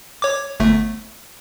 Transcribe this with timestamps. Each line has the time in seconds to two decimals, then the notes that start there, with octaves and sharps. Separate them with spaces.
0.22 C#5 D6
0.60 G1 A3